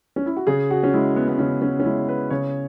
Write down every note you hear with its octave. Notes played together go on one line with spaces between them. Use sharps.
C#4
E4
F#4
C#3 G#4
F#4
C#4
G#3 E4
B3
B3
C#3 C#4
C#4
C#4
G#3 E4
B4
C#3 C#5